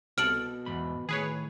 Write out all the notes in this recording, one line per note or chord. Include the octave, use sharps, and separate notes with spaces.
C2 B2 A4 F6 D7 F#7
E2 G#2 B5
A2 D#3 G#4 B4 C#5